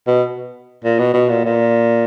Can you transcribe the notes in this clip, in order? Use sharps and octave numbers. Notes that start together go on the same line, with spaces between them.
B2
A#2
B2
B2
A#2
A#2